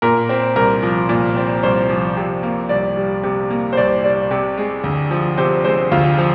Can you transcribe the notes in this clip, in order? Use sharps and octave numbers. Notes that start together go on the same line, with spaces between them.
A#2 A#4
C4
C2 A#4
F3
A#2
C4
C2 C5
F3
C3
A#3
C2 D5
G3
C3
A#3
C5
C2 D5
G3 D5
C3
G#3
D2
F3
C3 C5
G#3 C5
D2 F4
F3